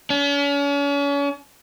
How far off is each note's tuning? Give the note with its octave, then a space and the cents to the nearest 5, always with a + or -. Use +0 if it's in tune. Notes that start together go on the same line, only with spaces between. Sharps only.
C#4 +40